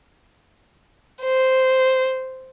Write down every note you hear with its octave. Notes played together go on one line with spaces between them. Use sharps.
C5